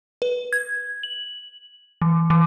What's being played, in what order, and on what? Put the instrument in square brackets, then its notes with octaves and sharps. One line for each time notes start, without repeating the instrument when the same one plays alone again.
[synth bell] B4
G#6
F#7
E3
E3